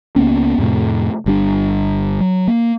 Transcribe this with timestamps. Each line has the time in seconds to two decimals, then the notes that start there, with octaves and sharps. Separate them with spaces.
0.16 C#2 A#3 B3 C#4
0.58 F2 A2 C3 A3
1.26 G1 G3 D4
2.20 F#3
2.47 A#3